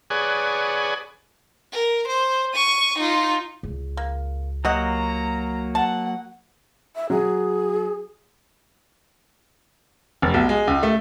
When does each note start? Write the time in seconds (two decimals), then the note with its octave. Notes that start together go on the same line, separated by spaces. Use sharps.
0.10 G#4 B4 C#5 D5 F#5 G#5
1.72 A#4
2.07 C5
2.54 C#6 D#7
2.98 D#4 F4
3.63 C#2
3.97 A#3
4.65 F#3 A#3 F#4 G4 D#5 F#5 A#5
5.75 F#5 A5
6.95 E5
7.10 F#3 G#4
10.22 F1
10.34 B1
10.49 G#3
10.67 C#2
10.83 A3